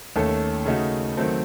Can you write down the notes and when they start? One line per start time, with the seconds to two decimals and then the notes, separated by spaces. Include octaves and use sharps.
0.16 D#2 D#3 A3 C#4 A4
0.66 C#3 A3 D#4 F#4
1.17 D#3 F#3 A3 C4